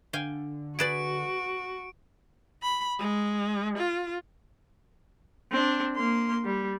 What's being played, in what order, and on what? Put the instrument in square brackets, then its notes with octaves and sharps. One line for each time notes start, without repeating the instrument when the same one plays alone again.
[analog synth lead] D3 [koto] F5 G5 G#5
[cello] F#4 [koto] G#4 B4 D5 [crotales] D7
[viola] B5
G#3
F4
C4 D4
A#3 C6
G3